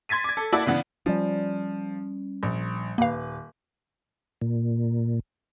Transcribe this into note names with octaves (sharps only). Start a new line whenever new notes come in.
C6 G#6 A6 B6 D#7
D6 G#6
A4
A#3 E4 F#4 D5 A5
C#3 E3 B3 D4
F3 G3 C#4
A#1
D#1 A#3 B4 F5
A#2